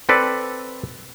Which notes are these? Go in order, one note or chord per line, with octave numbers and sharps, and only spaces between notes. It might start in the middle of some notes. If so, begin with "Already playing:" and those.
C4 A4 B4 D5